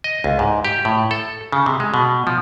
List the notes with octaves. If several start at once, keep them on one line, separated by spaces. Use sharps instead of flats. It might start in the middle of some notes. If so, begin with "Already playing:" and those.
D#5
C#2
G#2
G4
A2
A4
C#3
C3
G#3
B2
F3